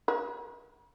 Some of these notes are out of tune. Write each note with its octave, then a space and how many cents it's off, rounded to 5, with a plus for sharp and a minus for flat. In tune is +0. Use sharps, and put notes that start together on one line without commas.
A#4 +40